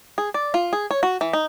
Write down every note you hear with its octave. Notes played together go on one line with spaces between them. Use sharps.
G#4
D5
F4
G#4
C#5
F#4
E3
D#4